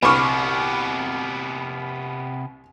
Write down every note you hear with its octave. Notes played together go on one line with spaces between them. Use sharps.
C2 C3 B3 B5 C#6 D6 F6